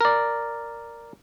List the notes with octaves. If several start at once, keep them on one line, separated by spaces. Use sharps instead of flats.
A#4 D5